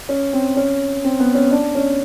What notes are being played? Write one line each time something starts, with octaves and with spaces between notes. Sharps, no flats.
C#4
C4
C#4
C4
B3
C#4
D4
C#4